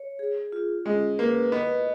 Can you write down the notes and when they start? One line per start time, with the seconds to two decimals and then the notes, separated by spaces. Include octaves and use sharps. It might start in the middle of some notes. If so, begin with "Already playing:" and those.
Already playing: C#5
0.19 G#4
0.52 F4
0.85 G#3 C#4
1.19 A#3 B4
1.52 B3 D#5